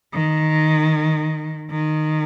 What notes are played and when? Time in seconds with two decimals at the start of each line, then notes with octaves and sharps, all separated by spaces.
0.13 D#3
1.70 D#3